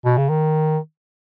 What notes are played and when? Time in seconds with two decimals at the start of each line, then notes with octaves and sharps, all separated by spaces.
0.05 B2
0.18 C#3
0.29 D#3